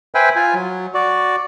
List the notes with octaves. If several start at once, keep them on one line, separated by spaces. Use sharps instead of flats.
B4 C5 E5 G5 G#5
F4 G#5
F#3
F#4 D5